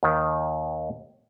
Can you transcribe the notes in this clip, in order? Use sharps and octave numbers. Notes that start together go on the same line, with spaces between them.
D#2 D#3